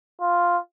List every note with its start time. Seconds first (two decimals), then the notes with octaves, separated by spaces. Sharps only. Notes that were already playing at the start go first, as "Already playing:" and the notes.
0.21 F4